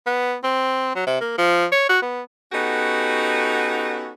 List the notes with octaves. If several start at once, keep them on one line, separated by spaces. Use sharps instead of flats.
B3
C4
F#3
C3
A#3
F3
C#5
F#4
B3
B3 C#4 D#4 F#4 G4 A4